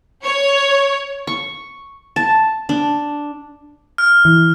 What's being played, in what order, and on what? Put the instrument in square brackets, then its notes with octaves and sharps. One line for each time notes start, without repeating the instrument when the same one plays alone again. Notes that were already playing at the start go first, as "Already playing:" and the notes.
[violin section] C#5
[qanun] C#6
A5
D4
[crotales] F6
[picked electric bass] E3